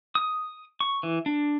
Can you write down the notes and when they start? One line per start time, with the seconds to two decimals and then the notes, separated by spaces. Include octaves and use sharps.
0.15 D#6
0.80 C#6
1.03 E3
1.26 D4